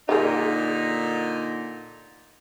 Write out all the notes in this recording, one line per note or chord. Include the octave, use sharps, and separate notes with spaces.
A#2 D3 D#3 G3 D#4 G#4